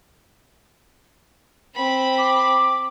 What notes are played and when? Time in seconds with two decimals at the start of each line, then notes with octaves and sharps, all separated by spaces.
1.75 C4 B5
2.18 D6